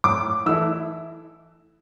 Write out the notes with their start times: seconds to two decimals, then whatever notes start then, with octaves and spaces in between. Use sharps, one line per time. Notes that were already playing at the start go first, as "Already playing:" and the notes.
0.04 A2 D6
0.46 E3 A3 E4 E6